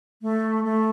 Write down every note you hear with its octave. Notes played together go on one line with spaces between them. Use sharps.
A3
A3